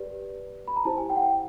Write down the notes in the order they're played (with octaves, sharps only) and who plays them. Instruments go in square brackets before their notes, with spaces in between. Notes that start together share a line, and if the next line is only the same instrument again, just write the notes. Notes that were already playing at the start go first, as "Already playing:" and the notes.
Already playing: [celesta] G4 B4 D5
B5
A#5
E4 G4 C5 A5
G#5
G5
F#5
G5